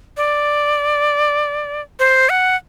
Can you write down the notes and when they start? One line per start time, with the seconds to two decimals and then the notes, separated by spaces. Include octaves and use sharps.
0.17 D5
1.99 C5
2.29 F#5